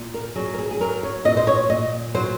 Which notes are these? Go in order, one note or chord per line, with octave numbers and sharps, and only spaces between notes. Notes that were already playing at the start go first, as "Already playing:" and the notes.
Already playing: A#2
A#4
F#3 G#4
A#4
G#4
G#4
F#3 A#4
C#5
A#2 D#5
C5
C#5
A#2 D#5
F#3 C5